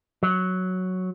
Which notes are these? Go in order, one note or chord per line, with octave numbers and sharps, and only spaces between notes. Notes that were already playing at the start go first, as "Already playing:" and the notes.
F#3